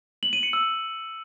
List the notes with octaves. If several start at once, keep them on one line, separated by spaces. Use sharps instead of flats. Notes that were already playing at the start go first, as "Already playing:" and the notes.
F#7
D#7
C#7
E6